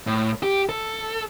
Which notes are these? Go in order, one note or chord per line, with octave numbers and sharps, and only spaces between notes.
A2
G4
A4